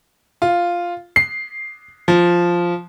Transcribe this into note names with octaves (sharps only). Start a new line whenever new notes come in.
F4
C7
F3